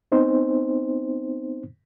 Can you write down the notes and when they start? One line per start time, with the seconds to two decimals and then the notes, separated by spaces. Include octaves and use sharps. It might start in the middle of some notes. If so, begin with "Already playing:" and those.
0.12 B3 C4 D#4 C5